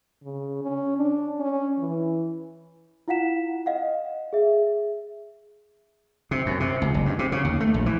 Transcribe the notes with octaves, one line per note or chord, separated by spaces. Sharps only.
C#3
C#4
D4
C#4
E3
E4 F4 F5 F#5 B6 E7
D#5 F5 F#5
G#4 E5
C3
F#2
C3
C#2
F#1
G2
C3
C#3
D#2
A3
A#1
E3